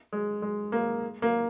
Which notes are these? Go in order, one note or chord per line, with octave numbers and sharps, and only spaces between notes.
G#3
G#3
A#3
A#3